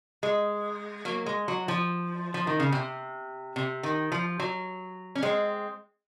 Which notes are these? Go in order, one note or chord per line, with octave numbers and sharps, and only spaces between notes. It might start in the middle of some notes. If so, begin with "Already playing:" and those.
G#3
F#3 A#3
G#3
F#3
F3
F3
D#3
C#3
C3
C3
D#3
F3
F#3
C#4
G#3 C4